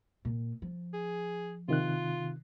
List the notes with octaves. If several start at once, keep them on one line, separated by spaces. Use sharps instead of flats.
A#2
F3
G#4
C3 D#3 F4 F#6